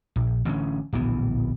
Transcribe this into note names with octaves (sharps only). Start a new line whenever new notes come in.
A#1
A1 D3 B3 C#4
D1 A#1 E3 B3